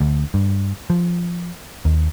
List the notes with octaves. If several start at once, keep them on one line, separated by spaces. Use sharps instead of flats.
D2
G2
F3
D#2